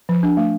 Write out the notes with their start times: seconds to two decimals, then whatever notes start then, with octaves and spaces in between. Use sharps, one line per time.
0.09 F3
0.23 D4
0.37 A3